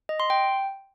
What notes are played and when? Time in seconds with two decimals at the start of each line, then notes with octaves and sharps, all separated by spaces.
0.09 D#5
0.20 C6
0.30 G5